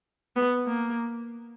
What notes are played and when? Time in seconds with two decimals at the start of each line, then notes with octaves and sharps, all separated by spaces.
0.36 B3
0.67 A#3